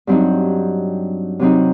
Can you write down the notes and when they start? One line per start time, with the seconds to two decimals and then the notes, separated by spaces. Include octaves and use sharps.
0.07 G2 F#3 C4 D#4
1.39 C3 F#3 C4 D#4